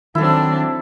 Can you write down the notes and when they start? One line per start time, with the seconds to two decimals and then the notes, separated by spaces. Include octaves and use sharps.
0.15 D#3 F#3 C4 D4 E4 A4